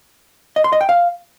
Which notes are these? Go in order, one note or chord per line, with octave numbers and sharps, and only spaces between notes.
D#5
C6
D#5
G5
F5